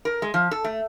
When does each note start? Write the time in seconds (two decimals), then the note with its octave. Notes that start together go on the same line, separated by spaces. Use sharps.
0.05 A#4
0.22 G#3
0.34 F3
0.51 A4
0.64 A3